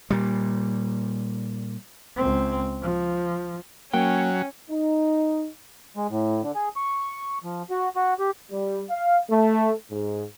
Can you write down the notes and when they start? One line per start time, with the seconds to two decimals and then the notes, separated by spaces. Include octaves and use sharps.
0.10 A#2 G3
2.16 C#2 C4
2.83 F3
3.93 F#3 A#3 C#4 G5
4.70 D#4
5.97 G#3
6.10 A2
6.42 D3
6.55 G#4
6.76 C#6
7.44 F3
7.70 F#4
7.96 F#4
8.19 G4
8.50 G3
8.90 F5
9.30 A3
9.91 G#2